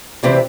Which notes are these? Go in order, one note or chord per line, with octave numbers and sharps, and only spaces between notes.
D2 C3 E3 C4